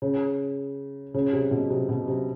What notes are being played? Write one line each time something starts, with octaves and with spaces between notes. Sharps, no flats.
C#3
C#3
C3
B2
C3
B2
C3